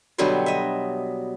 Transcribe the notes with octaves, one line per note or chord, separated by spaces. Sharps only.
B2 D3 F#3 G3 C5
D#5 E5